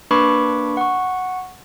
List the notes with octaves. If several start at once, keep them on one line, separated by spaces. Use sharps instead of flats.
A#3 D4 B4 B5 C#6 D6
F#5 C#6